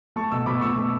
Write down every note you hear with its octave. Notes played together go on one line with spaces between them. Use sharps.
A3 A5 C#6
B2 C#6 E6
B2 B5 D6
A3 C#6 E6
A3